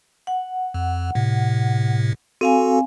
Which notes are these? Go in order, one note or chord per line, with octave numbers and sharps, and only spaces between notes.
F#5
F2
A2 C3
C4 F#4 A4 F5 G#5